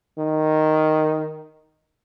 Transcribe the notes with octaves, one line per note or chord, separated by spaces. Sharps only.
D#3